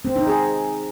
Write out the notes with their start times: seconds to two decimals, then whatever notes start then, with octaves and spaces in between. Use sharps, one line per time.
0.05 C4
0.16 D#4
0.27 G#4